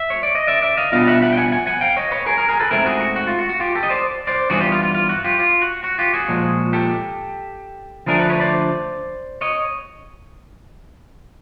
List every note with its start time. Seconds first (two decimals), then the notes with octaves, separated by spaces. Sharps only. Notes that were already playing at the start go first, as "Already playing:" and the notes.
Already playing: E5
0.10 C#5
0.23 D5
0.35 D#5
0.47 D5 E5
0.62 D5 E5
0.77 D#5 F5
0.92 B2 G3 B3 D4 F4 D#5 F5
1.07 E5 F#5
1.22 E5 F#5
1.33 G5
1.37 F#5 G#5
1.52 F#5 G#5
1.67 F#5 G#5
1.81 F5 G5
1.97 C#5 D#5
2.11 B4 C#5
2.26 G#4 A#4
2.37 G#4 A#4
2.48 G#4 A#4
2.60 A4 B4
2.71 G#2 E3 A3 C4 E4 G#4 A#4
2.86 F#4 G#4
3.01 F#4
3.16 F#4
3.27 F4
3.39 F#4
3.49 F#4
3.60 F4 G4
3.75 G4 A4
3.83 D#5
3.90 C5 D5
4.27 C5 D5
4.50 G2 E3 G3 B3 F#4 G#4
4.61 F4 G4
4.72 F4
4.83 F4
4.94 F4
5.09 F#4
5.24 F4 G4
5.39 F4
5.62 F#4
5.84 F#4
5.99 F4 G4
6.13 F#4 G#4
6.28 A#2 F3 G#3
6.73 G4 A4
8.06 D3 F3 A3 D4 G#4 A#4
8.18 A4 B4
8.29 B4 C#5
8.40 C5 D5
9.41 C#5 D#5